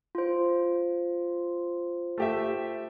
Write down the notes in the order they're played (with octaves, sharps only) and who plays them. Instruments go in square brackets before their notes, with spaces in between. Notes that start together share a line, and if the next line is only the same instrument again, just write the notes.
[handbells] F4 C5
[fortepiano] A3 G4 E5